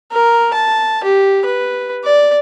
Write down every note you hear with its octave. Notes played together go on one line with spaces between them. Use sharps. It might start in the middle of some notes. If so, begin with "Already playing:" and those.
A#4
A5
G4
B4
D5